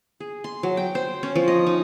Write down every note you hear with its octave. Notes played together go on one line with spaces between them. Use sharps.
G#4
C6
F#3
G5
C5
C#4
F3
D#5
D#4